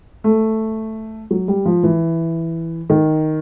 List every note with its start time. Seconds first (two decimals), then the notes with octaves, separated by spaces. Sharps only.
0.24 A3
1.31 F#3
1.48 G3
1.66 F3
1.83 E3
2.90 D#3